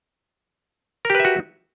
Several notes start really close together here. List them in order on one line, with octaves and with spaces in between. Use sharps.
A#4 G4 B4 E5 F#4